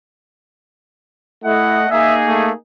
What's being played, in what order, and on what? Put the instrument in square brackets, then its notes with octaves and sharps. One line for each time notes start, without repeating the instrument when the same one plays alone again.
[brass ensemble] A3 D#5 F#5 [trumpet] E4
[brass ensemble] A#3 D#4 G#4 [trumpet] E5
[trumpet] A3